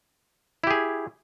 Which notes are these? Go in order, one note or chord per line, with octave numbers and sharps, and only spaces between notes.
E4 G4 G#4